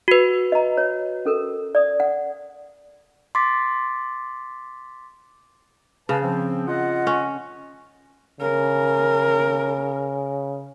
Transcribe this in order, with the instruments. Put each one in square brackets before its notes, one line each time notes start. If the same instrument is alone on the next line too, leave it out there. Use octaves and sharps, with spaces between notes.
[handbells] F#4 B4
[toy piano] D#5 A#5
C#5
C#4 A4 A#4
D5 D#6
F#5
[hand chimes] C6 D6 A6 B6
[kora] C#3 [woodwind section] B4 F5 A5
[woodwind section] F3 C4
F4 D#5 F#5
[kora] C#4
[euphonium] C#3 [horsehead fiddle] A#4